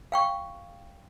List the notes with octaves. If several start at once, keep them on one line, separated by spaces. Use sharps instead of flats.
F5 G5 C#6